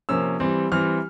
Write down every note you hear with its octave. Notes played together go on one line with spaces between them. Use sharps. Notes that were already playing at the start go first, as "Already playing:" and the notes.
C3 F3 A#3 C#4 E6
E3 G3 C4
E3 G3 C4 F6